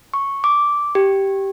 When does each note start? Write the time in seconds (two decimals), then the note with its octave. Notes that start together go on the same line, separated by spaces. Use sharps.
0.14 C#6
0.44 D6
0.95 G4